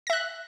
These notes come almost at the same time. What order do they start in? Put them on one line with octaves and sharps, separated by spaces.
A#6 E5 F#6